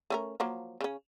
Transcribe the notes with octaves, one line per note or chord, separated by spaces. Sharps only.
A3 C#4 A#4
F3 F#3 A#3
C#3 C#4